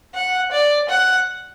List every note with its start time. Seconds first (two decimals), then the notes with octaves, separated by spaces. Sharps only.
0.15 F#5
0.52 D5
0.89 F#5